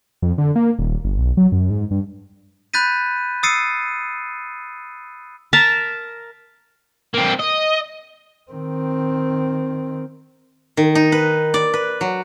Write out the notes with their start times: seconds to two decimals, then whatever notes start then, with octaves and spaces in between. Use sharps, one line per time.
0.22 F2
0.38 D3
0.56 A#3
0.79 D#1
1.05 G1
1.19 B1
1.37 F#3
1.52 F#2
1.70 G#2
1.91 G2
2.73 B5 F#6 G6 A6 B6 D#7
3.43 D#6 E6 A6 C7 C#7 D#7
5.53 A#4 E5 A5 A#5
7.14 A#3 C4
7.40 D#5
8.52 D#3 C4
10.77 D#3
10.95 D#4
11.12 B4
11.54 D5
11.74 B4
12.01 F#3